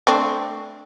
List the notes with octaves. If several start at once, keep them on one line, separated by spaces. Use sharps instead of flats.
A3 C4 D4